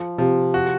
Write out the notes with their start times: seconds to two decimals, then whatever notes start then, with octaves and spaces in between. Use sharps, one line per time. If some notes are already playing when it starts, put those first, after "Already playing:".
Already playing: F3
0.18 C3 F3
0.54 F#4